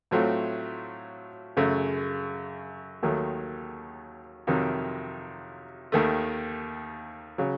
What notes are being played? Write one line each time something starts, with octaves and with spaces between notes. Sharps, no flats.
A2 F#3 A3 C4 F4
F#2 C#3 A3
D#2 D#3 F#3 A3
F2 C3 D#3 F#3
D#2 D#3 A3
C#3 F#3